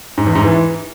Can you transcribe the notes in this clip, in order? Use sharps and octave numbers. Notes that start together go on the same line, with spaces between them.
G#2
E2
G#2
E3